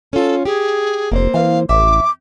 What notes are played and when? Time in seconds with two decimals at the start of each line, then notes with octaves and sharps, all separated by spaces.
0.13 C#4 F4 A4
0.45 G4 G#4
1.11 F1 A#3 C4 C5
1.34 E3 F5
1.69 A1 F2 E5 D6